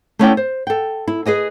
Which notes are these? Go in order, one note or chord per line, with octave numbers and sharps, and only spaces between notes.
A3 B3 C#4 E4 D5 G5
C5
A4 G5
E4
G#4 B4 D#5 G#5